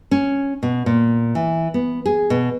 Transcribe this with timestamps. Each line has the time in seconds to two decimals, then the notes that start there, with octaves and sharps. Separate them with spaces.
0.11 C#4
0.63 B2
0.86 A#2
1.35 E3
1.74 B3
2.06 G#4
2.30 B2